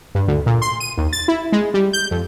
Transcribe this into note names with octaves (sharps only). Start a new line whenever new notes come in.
G2
D2
A#2
C6
D#7
D#2
A6
E4
G#3
G3
G6
F2